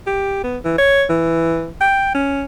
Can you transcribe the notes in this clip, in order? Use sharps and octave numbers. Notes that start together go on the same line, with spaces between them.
G4
B3
E3
C#5
E3
G5
C#4